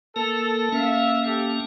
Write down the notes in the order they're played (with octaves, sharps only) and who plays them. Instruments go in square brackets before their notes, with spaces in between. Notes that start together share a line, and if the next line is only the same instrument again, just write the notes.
[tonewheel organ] A#3 A#4 [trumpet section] A4
[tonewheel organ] A#3 C#4 [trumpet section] E5 F5
[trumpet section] G4 A4